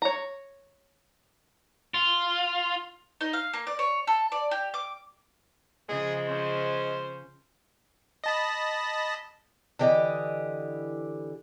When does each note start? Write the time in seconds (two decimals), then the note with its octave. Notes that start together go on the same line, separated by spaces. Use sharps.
0.02 C#5 A#5
1.94 F4
3.21 D#4
3.33 F5
3.53 A#3
3.67 D5
3.79 C#5
4.07 A4
4.32 D5
4.51 G4
4.74 D6
5.89 C#3 F3 G#3 G#4
6.28 C#4 C5
8.24 D#5 A5 B5
9.79 D3 E3 G4 D#5